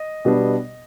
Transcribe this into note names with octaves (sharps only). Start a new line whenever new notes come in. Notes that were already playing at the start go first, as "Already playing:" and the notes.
Already playing: D#5
B2 G3 B3 D4